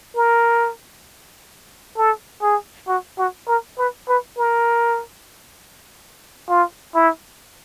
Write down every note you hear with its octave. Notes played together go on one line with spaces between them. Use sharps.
A#4
A4
G#4
F#4
F#4
A#4
B4
B4
A#4
F4
E4